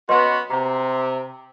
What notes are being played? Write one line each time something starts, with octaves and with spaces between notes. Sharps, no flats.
B3 C#4 F#4 B4 D#5 C6
C3 A#5